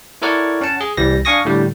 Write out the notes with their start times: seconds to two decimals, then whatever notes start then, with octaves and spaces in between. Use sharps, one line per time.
0.22 E4 A4 A#4 C#5 D5 F#5
0.61 C#4 F#5 A5
0.81 G#4
0.97 C2 E3 G3 A#6
1.25 D4 F5 G#5 C#6 D#6 A#6
1.45 A2 D3 G3